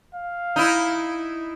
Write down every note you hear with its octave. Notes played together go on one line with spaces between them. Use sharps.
F5
D#4 E4